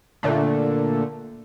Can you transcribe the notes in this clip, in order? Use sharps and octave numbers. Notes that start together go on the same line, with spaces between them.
A#2 D3 A3